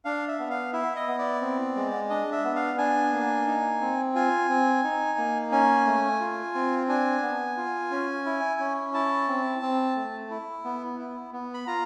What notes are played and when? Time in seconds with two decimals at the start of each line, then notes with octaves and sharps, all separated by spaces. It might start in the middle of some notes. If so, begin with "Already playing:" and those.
0.05 D4 F5
0.28 E5
0.39 B3
0.50 F5
0.73 E4 E5
0.96 D#5
1.08 B3
1.19 D5
1.41 C4
1.76 G#3
2.09 D4 D#5
2.32 E5
2.44 B3
2.56 F5
2.78 D4 G#5
3.13 A#3
3.47 D#4
3.81 C4
4.15 F4 G#5
4.49 C4
4.84 D#4
5.18 A#3
5.52 C#4 G#5
5.86 A3
6.21 F4
6.55 C4
6.89 D4 G#5
7.22 B3
7.57 F4
7.91 C#4
8.25 E4
8.59 C#4
8.94 E4 A5
9.28 C4
9.62 C4
9.96 A3
10.31 E4
10.64 B3
10.99 E4
11.33 B3
11.54 B5
11.67 F4 A#5